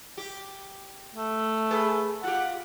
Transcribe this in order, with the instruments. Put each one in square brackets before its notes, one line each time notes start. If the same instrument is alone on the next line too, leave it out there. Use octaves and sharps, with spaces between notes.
[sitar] G4
[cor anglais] A3
[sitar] G#4 B4
[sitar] F4 G4 [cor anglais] F#5